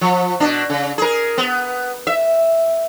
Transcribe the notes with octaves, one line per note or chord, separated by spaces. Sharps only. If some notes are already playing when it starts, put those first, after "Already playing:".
F3
B2 D4
C#3
G#4 A#4
B3
E5